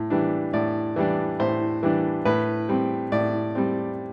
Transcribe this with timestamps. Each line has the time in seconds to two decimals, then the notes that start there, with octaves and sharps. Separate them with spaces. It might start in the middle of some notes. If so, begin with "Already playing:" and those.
Already playing: A2
0.10 E3 G3 D4
0.53 A2 D5
0.96 E3 G3 D4
1.40 A2 C5
1.83 E3 G3 D4
2.25 A2 B4
2.69 G3 C4
3.12 A2 D5
3.55 G3 C4